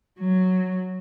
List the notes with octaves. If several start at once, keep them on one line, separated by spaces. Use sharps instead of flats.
F#3